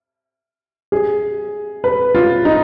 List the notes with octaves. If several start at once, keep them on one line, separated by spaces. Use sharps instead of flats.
G#4
B4
F4
D#4